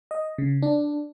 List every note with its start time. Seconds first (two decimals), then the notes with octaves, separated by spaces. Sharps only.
0.11 D#5
0.38 C#3
0.62 D4